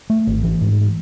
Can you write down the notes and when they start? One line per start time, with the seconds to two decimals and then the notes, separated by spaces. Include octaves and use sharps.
0.10 A3
0.27 G#1
0.44 E3
0.61 G#2